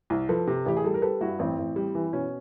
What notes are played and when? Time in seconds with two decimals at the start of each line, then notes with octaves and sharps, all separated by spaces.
0.10 C2
0.29 F3 A4 B4
0.47 C3
0.66 A1 G4
0.77 G#4
0.84 G3 A4
0.94 A#4
1.02 G3 A4 B4
1.21 G2 E4 F#4
1.39 A1 C4
1.58 A1
1.76 G3
1.95 E3
2.13 B2 C#4